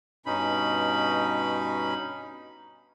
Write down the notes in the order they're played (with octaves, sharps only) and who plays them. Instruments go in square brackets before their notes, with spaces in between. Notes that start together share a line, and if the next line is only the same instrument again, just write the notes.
[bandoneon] G2 B2 C#4 D#4 B5